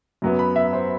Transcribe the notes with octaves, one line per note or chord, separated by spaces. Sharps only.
F#2 F#3 B3
B5
E5
C5